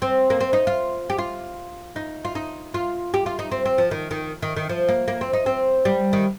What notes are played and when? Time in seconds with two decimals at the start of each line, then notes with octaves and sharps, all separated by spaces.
0.02 C4
0.30 A#3
0.40 C4
0.53 D#4
0.67 F4
1.10 G4
1.19 F4
1.96 D#4
2.25 F4
2.35 D#4
2.74 F4
3.14 G4
3.26 F4
3.39 D#4
3.51 C4
3.65 C4
3.78 F3
3.91 D#3
4.11 D#3
4.42 D#3
4.56 D#3
4.69 F3
4.89 A#3
5.08 A#3
5.21 C4
5.33 D#4
5.46 C4
5.85 G3
6.13 D#3